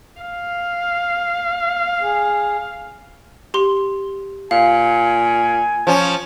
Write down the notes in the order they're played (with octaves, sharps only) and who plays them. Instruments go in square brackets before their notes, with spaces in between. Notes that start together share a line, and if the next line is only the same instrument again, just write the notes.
[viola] F5
[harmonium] G#4
[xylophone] G4 C6
[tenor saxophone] A#2 [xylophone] F5 [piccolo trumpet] G#5
[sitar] F3 C#4